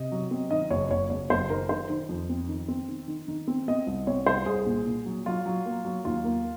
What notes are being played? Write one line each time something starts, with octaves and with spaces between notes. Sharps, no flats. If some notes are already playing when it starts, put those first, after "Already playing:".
Already playing: C3 D#5
F#3
C4
D#3 D#5
F#1 C#5
F#1 C#5
F#1 C#5
F#1 C5
D#3 A#4
D#3 C5
D#3
F2
C4
D#3
C4
D#3
D#3
D#3
C4
C4 D#5
C2
C4 C#5
C2 C5
C2 G#4
A#2
A#2
F#3
F#3 F4
F#3
A#3
F#3
D#2 F4
A#3